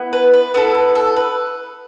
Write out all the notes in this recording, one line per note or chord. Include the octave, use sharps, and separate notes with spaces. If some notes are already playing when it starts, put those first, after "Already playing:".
Already playing: B3 E4
B4
B4
B3 E4 A4 B4
B4
A4
B4